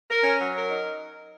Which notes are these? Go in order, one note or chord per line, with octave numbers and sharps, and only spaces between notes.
A#4
C#4
F#3
A#4
D#4